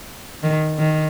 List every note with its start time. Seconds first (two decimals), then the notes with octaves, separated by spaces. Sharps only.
0.43 D#3
0.79 D#3